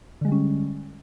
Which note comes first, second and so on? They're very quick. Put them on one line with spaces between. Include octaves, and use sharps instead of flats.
D3 G#3 G3 C#4